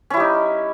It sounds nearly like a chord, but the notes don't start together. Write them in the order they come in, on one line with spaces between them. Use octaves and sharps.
C#4 E4 G3 D#4